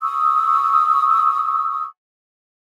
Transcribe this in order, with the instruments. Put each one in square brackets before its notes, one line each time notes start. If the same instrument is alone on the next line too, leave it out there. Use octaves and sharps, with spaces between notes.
[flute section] C#6 D#6 E6